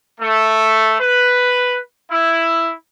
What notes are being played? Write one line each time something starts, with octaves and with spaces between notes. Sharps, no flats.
A3
B4
E4